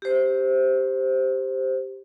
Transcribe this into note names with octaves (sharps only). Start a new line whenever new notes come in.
G4 C5